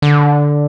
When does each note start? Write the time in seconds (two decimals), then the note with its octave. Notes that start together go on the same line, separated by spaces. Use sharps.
0.02 D3